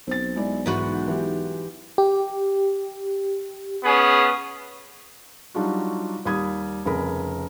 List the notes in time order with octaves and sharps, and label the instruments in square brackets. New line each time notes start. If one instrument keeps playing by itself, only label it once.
[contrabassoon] B1 [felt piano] C4 A6
[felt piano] G#3 E4 D5
[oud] G#2 B3 F#4 [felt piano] E3
[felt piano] E3 G4
[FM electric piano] G4
[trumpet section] B3 C#4 G#4
[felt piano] F#3 G3 D4 D#4 F4 F#4
D#2 G3 B5 D#6 G#6
F1 C#3 G#4 A#4 B5